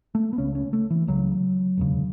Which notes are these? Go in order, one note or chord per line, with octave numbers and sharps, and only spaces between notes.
A3
B3
C#2 C#3 C#4
C#4
A3
E3
C#2 C#3 F#3
E1 D2 C#3